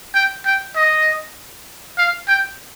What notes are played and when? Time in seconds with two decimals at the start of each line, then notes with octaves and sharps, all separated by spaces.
0.15 G5
0.45 G5
0.76 D#5
1.98 F5
2.28 G5